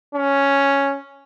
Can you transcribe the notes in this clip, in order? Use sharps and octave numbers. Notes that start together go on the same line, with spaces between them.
C#4